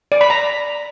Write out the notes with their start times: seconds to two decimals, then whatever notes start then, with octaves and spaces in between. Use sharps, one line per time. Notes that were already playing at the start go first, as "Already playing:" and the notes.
0.12 D5
0.21 B5
0.30 A#5